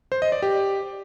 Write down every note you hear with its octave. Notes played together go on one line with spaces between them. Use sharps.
C5
D#5
D5
G4